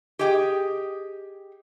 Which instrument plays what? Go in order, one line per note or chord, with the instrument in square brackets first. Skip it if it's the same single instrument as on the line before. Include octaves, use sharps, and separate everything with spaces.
[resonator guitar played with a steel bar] G4 G#4 D#5 G5